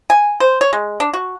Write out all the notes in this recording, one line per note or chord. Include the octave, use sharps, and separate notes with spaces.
G#5
C5
C#5
G#3
D4
F#4